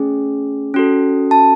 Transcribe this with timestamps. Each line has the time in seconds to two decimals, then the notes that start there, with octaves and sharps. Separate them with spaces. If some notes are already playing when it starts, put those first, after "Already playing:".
Already playing: A3 C#4 G#4
0.74 C#4 F#4 A4
1.31 A5